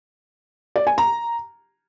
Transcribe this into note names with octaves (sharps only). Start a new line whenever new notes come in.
D5
G#5
A#5